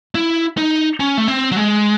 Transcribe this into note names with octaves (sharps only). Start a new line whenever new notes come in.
E4
D#4
C#4
A3
C4
F#3
G#3